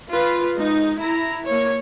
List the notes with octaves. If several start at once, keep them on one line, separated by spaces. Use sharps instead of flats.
F4 B4
G#3 D#4
E4 A#5
A#3 C#5